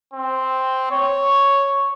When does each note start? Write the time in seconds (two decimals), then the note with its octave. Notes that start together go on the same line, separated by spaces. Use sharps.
0.13 C4
0.92 C#5